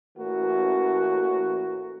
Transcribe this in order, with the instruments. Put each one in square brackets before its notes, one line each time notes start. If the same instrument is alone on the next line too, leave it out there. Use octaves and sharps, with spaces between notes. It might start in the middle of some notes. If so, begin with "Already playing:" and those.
[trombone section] A1 E3 A3 A#3 C#4 F#4